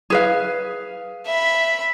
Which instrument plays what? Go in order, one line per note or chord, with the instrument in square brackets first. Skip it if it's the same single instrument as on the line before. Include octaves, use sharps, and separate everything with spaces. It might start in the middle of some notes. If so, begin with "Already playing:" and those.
[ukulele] G#4 B4 F5
[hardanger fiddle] E5 B5